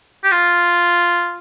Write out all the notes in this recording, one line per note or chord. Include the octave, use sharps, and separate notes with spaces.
G4
F4